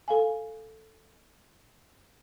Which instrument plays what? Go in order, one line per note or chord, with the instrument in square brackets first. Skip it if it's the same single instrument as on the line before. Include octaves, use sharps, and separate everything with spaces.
[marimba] A4 F5 G#5